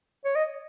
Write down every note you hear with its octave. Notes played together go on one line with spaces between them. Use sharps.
C#5
D#5